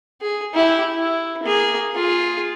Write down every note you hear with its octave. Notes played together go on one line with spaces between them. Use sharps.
G#4
E4 G4
E4
A#3 G#4
F4 G#4